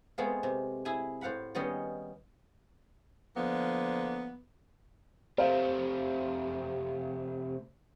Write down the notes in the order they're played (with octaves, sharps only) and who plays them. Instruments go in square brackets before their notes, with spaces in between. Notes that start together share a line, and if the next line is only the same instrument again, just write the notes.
[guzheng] G#3 A3 B3 C4 F4 G#4
C3
E4 G#4 E5 G#5
A2 C5 F5 F#5 B5
D#3 G3 B3 C#4 G#4 D#5
[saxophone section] D3 F3 A#3 B3
[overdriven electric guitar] C3 A3 [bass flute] G4 [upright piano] A#4 C5 F5